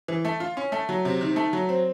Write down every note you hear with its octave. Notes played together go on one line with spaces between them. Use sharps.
E3
A3
F4
C#4
A3
F#3
C3
D#3
A3
F#3
C4